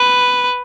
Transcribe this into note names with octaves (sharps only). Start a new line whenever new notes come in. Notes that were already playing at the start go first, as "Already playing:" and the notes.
Already playing: B4